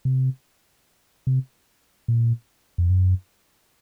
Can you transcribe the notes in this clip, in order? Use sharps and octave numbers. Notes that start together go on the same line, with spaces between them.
C3
C3
A#2
F2
F#2